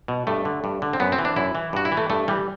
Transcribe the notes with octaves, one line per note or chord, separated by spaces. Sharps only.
B2
G2 A3
D3
G2
D3
C4
F#2 B3
C4
E3
D4
F#2 E4
E3
G2 F#4
E4
E3
A3
G2 A3
E3 G3